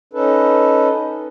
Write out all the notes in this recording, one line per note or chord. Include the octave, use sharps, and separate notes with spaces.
C#4 D#4 A4 B4